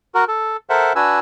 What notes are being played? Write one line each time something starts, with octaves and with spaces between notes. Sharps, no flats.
F#4 A#4
A4
A4 A#4 C5 E5 F#5
D4 F#4 B4 G#5 E6